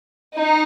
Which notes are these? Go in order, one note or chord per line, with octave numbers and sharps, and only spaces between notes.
D#4